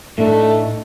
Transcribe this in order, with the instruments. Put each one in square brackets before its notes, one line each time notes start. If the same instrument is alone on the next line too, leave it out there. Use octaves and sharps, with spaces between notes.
[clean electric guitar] A2 D4 D#4 [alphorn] A3